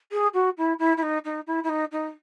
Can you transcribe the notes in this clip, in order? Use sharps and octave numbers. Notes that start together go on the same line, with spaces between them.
G#4
F#4
E4
E4
E4
D#4
D#4
E4
E4
D#4
D#4